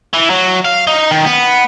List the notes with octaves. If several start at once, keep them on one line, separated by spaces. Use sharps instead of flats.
E3
F#3
F5
D#4
D#3
B3